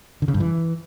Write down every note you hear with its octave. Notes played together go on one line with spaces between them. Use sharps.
D3
C#3
G2
E3